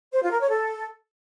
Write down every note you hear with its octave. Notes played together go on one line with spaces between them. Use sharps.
C5
F4
A#4
C#5
A4